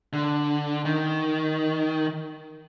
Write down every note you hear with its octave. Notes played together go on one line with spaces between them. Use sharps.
D3
D#3